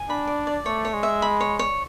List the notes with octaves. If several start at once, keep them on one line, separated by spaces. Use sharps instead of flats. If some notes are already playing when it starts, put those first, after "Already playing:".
Already playing: G#5
D4 B5
D5
D5
A3 C#5
C#5
G#3
E5
B5
C#5
C#5